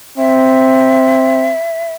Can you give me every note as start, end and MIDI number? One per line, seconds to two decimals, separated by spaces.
0.18 1.55 60
0.18 1.93 76